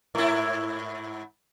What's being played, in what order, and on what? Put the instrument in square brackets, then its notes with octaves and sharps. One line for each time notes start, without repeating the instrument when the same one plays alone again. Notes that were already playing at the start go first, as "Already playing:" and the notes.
[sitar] G#2 E4